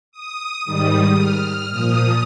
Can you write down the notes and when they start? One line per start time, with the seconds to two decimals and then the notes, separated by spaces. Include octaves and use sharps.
0.12 D#6
0.65 G#2 D#3 G3 D#6
1.18 F6
1.70 A#2 F3 D#6